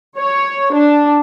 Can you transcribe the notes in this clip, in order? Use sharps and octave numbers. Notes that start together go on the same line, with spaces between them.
C#5
D4